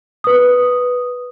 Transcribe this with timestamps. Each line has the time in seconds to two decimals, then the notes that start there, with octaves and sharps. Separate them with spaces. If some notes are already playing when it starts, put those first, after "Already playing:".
0.24 B4 D#6